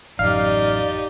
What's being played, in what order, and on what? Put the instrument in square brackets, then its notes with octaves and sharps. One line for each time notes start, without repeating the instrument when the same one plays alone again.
[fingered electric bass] A1 F#2 [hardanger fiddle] D#4 G4 [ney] D5 [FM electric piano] F5